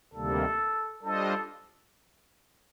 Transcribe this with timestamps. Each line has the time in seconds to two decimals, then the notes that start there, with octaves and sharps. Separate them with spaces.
0.14 D2 C3 D#3 G3 A#3 A4
1.03 G3 D4 F4 A4 C5 D#5